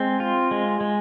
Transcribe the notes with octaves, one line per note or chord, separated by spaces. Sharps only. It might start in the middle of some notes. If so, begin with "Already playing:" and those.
Already playing: G#3 C4
F4
G#3
G#3